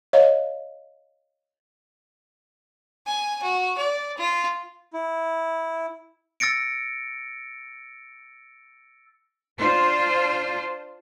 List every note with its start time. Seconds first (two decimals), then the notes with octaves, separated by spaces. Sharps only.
0.13 C#5 D#5 F5
3.07 G#5
3.43 F#4
3.78 D5
4.18 F4
4.93 E4
6.40 E6 A6 A#6 C#7 D7
9.59 D4 F4 C5